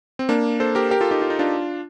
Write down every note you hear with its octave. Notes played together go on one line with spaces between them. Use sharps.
C4
A#3 D4
A4 C5
G4 A#4
G4 A#4
F4 A4
D#4 G4
F4
D#4
D4 F4